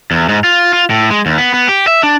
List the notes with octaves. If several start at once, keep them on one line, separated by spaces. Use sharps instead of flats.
E2
G#2
F4
F4
A2
G#3
D#2
B3
B3
G4
E5
D4